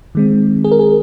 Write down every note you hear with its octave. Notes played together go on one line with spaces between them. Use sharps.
D#3 G#3 C4
G#4
A#4
G#4